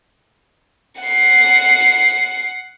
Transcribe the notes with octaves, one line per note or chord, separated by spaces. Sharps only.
F#5 C7